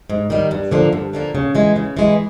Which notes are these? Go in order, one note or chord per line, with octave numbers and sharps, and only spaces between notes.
G#2
D#3 G3
G2
D3 F3 A#3
G2
D3 F3 A#3
C#3
E3 G#3
C#3
E3 G#3